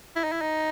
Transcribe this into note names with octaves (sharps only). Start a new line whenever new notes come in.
E4
D#4
E4
D#4